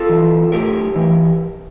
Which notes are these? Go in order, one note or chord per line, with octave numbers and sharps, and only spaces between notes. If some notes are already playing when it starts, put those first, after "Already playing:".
Already playing: F4 A4
E3
A2 G4 A#4
E3